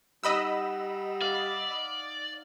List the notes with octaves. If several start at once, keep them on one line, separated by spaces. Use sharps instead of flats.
G3 D#4 D#5 F#5 B5 E6
D5 F5